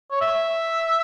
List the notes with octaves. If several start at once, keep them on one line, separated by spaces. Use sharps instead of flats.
C#5
E5